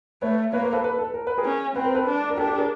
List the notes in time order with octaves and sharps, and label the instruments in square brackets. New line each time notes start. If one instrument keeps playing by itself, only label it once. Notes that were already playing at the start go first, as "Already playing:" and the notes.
[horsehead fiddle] A3 [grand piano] B4 C#5
[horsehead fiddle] A#3 [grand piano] B4 C#5
[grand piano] A#4 C5
A4 B4
A4 B4
A4 B4
A#4
B4
G#4 A#4
[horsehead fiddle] C#4
[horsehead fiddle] C4 [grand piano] B4
[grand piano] A#4
A4 B4
[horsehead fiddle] D4
[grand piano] A#4
[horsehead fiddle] D4 [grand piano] G4 A4
[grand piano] G4 A4
G#4 A#4